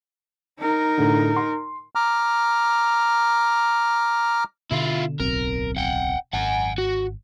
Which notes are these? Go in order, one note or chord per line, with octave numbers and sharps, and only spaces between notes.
D#4 A#4
A2 D3
C6
A#5 D6 F6
B2 D3 E4 F4
D1 B1 C4 A#4
F#5 G5
G#1 F#5 G#5
F#4